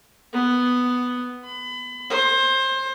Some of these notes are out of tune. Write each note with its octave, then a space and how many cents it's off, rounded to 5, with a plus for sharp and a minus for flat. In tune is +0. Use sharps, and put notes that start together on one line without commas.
B3 +5
B5 +30
C5 +25